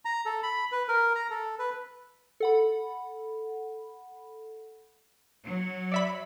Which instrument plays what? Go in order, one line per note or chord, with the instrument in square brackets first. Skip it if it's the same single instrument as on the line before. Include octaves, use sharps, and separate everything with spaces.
[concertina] A#5
A4
B5
B4
A#4
A#5
A4
B4
[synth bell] A4 F#5 B5
[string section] F#3
[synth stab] D5 E5 B5